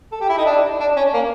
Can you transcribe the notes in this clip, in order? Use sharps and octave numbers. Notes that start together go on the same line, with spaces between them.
A4
G4
E4
D#4
D4
D4
C#4
A#3